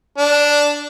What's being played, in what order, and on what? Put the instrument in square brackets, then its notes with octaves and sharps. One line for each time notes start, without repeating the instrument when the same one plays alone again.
[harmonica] D4